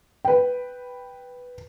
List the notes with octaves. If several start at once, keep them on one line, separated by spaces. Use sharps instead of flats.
B4 G5